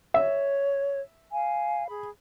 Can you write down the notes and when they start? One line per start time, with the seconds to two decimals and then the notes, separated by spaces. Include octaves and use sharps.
0.14 C#5 E5
1.31 F5 G#5
1.88 G#4 B5